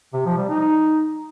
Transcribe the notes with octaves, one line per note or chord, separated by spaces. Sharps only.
C3
F3
G3
D#4